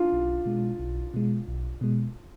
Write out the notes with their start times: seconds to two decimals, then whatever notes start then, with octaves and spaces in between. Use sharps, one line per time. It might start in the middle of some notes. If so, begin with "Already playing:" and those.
Already playing: D4 F4
0.12 B1
0.46 B2 G#3
0.79 B1
1.14 B2 G#3
1.48 B1
1.81 B2 G#3